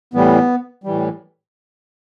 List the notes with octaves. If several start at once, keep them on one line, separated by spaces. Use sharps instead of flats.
A2 E3 G3 B3
A2 E3 G3